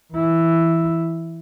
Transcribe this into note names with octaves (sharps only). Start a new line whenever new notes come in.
E3 E4